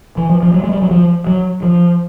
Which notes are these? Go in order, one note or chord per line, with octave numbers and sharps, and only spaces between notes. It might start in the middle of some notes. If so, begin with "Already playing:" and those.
E3
F3
F3
F#3
G#3
G3
F#3
F3
F#3
F3